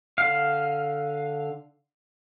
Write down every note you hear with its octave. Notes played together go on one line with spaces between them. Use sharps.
D3 F5